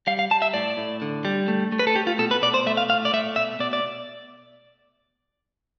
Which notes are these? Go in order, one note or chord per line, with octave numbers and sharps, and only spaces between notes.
G3 F5
F5
G3 A5
E5
A2 D5
A2
D3
G3
A3
A3
B4
A4
A3 G4
F4
B2 A4
B4
B2 D5
C5
A3 E5
F5
A2 F5
D5
A3 E5
B2 E5
B2 D5
D5